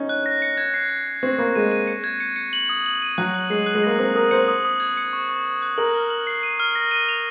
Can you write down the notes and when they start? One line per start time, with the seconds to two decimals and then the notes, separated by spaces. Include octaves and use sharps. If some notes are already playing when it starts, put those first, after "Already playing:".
Already playing: C#4 D#4
0.09 F#6
0.26 A#6
0.42 C#7
0.57 G#6
0.74 C7
0.90 C7
1.07 C7
1.23 C4 C#6
1.39 A#3 C#6
1.55 G#3 D#7
1.72 D#7
1.87 C#7
2.04 G#6
2.20 C#7
2.36 C#7
2.53 F#7
2.69 D#6
2.86 F#7
3.02 D#7
3.18 F#3 F#6
3.34 F#6
3.50 G#3 C7
3.66 F#6
3.75 G#3
3.83 A#3 A#6
3.99 C4 D#6
4.16 A#4 D#6
4.31 C5 C#7
4.48 D#6
4.65 D#6
4.80 G#6
4.97 C#7
5.13 C#6
5.29 C#6
5.45 C#6
5.62 F#6
5.78 A#4 F#7
5.94 F6
6.10 F#7
6.27 C7
6.43 D#7
6.60 F6
6.75 A#6
6.91 D#7
7.09 F7